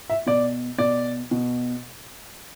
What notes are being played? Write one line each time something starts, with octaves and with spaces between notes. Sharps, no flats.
E5
B2 D5
B2 D5
B2